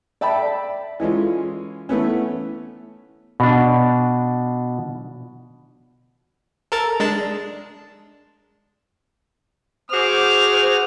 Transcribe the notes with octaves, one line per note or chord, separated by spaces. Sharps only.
D5 E5 G5 A5 B5
E3 G#3 C#4 F4
E3 A3 B3 C#4
B2 D4
A4 A#4 A6
G#3 D4 A5
F#4 G#4 C5 D6 F6